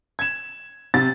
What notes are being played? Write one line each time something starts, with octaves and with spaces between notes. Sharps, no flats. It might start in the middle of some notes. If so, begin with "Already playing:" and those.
G#6 E7
C3 A6